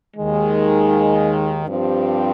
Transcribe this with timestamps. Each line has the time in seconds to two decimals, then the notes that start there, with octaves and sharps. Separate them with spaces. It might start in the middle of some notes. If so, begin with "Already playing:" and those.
0.17 D#2 D#3 G#3
1.67 G2 F3 C4 G4